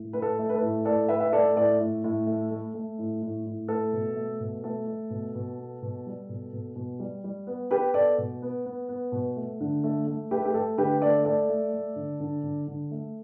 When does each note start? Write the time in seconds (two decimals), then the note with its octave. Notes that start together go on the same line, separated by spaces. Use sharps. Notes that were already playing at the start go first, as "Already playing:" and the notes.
Already playing: A2
0.13 A3 B4
0.22 A4
0.39 A3
0.49 B4
0.54 A4
0.61 A2
0.85 A2 A4 D5
1.08 A2 B4 E5
1.20 E5
1.33 A3 A4 D5
1.56 A2 A4 D5
1.80 A2
2.04 A2
2.27 A3
2.51 A3
2.74 A3
2.98 A2
3.22 A2
3.46 A2
3.68 A3 A4
3.92 B2
4.16 A3
4.40 B2
4.64 A3 A4
4.87 A3
5.10 B2
5.35 B2
5.58 B3
5.82 B2
6.06 G3
6.29 B2
6.53 B2
6.76 B2
6.99 G3
7.24 G3
7.47 B3
7.70 B3 G4 B4
7.94 B3 A4 D5
8.18 B2
8.42 B3
8.66 B3
8.89 B3
9.12 B2
9.36 A3
9.60 D3
9.84 A3
10.07 A3
10.31 A3 G4 B4
10.45 G4
10.54 A3 A4
10.78 D3 G4 B4
11.01 A3 A4 D5
11.25 A3 A4 D5
11.49 A3
11.73 A3
11.96 D3
12.20 D3
12.43 D3
12.67 D3
12.91 A3